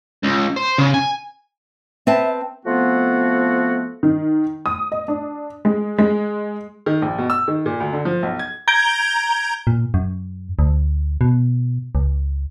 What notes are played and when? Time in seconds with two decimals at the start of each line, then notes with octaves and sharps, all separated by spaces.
0.24 C#2
0.57 C5
0.78 C#3
0.94 G#5
2.07 C4 B4 E5 A5
2.65 F3 A3 B3 C4 F4 F#4
4.03 D#3
4.66 D#6
4.92 D#5
5.08 D4
5.65 G#3
5.98 G#3
6.86 D#3
7.02 A#1
7.18 B2
7.30 E6
7.48 D#3
7.66 A#2
7.80 D2
7.93 D3
8.05 F3
8.23 B1
8.39 G#6
8.68 A#5 G6 G#6 D7 G7
9.67 A#2
9.94 F#2
10.59 D2
11.21 B2
11.95 C#2